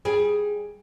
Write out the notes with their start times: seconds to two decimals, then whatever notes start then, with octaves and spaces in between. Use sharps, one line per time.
0.05 G3 G#4